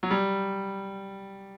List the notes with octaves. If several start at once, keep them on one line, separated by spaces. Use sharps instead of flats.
F#3
G3